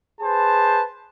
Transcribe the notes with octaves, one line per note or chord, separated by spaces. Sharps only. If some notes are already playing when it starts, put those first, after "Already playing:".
G#4 B4 C5 A5